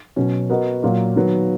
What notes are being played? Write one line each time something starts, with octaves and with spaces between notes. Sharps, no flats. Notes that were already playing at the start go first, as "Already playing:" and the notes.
B2 F#3 C#4
B3 F#4 A#4 D#5
A#2 F#3 A#3
D#3 F#3 B3